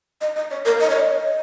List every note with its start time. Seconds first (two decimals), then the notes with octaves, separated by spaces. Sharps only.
0.21 D#5
0.36 D#5
0.51 C#5
0.66 A#4
0.80 D#5
0.90 C#5
1.00 D#5